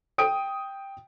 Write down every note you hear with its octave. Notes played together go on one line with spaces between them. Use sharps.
G5 D#6 D7